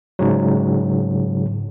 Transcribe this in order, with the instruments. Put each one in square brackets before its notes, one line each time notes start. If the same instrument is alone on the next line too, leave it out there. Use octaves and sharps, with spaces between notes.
[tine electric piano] G#2 C#3 F#3